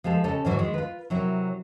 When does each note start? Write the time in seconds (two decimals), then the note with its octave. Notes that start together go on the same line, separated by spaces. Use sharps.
0.04 F3 G#3 G4 A4
0.24 C#3 G4 A4 D#5
0.45 G#2 D#3 E3 F#3 F#4
0.59 D#3 G#3
0.74 F4 B4
1.10 C3 F#3 E4 A#4